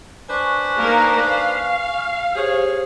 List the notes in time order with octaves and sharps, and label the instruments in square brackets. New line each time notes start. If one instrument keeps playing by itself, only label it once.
[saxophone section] D4 B4 C5 [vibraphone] G#5 C#6
[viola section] A#3 D#4 A#4
F5
[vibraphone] G4 C5 [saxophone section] G#4 C#5